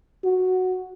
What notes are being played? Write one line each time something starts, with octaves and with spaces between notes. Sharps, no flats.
F#4